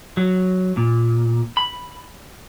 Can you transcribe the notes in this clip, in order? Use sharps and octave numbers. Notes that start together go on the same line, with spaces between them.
F#3
A#2
B5